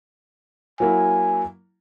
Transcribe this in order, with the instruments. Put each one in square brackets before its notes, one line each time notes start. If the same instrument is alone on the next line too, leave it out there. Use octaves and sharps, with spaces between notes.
[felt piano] F#3 A#3 E4 [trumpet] G#5